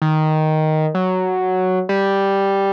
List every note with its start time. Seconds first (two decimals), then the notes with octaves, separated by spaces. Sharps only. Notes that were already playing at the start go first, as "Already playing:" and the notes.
0.02 D#3
0.95 F#3
1.89 G3